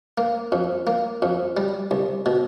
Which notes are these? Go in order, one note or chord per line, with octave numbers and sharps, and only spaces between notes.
A#3
F2
A#3
F2
G3
C2
B2